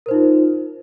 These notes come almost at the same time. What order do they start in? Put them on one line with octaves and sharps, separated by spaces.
A#4 C5 D#4 F4